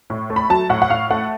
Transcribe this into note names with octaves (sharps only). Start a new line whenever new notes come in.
A2
A3
B5
F#3 A5
A2 F#5
F#5
A2 F5
A3 F#5